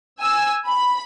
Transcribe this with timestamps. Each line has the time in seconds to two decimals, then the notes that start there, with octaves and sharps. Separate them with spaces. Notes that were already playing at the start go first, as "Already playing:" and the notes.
0.20 G#5 E6
0.68 B5